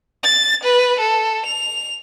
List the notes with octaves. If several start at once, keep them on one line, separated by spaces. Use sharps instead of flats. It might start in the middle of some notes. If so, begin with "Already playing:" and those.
A6
B4
A4
F7